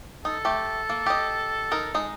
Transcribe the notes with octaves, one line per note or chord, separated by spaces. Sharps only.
D#4 A4
A3 G4
A#3
G4 D#5
D#4 A#4
G#3 D#4